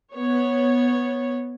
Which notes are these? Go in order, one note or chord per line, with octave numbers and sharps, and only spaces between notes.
B3 C#5